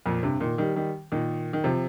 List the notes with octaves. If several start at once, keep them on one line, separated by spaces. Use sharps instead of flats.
F2 A#2
G2 C3
A#2 D#3
D#3 G3
D#3 G3
A#2 D#3
D#3
C3 F3